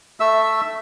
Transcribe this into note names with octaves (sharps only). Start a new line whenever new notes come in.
A3 E5 E6